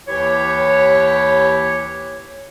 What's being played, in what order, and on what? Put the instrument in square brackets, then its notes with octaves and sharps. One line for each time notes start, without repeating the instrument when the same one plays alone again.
[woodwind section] D#2 E3 E4 G4 C#5